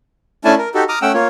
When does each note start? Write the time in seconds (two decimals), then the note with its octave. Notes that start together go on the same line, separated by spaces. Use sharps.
0.45 A3 C#4 D4 E4 G#5 A5
0.58 A#4
0.75 D#4 F#4 G4 A4
0.89 A#5 D6 D#6 F6
1.02 A3 C#4 F#5 G5 E6
1.14 A#3 F4 C#5